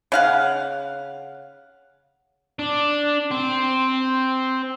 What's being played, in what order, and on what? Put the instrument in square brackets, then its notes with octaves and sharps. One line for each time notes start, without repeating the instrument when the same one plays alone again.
[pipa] C#3 F5 F#5
[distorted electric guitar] D4
C4